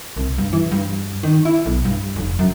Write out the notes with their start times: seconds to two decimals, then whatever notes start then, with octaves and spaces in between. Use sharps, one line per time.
0.17 C2
0.38 G2
0.53 E3
0.72 G2
1.23 D#3
1.45 E4
1.66 B1
1.85 G2
2.16 F1
2.39 F#2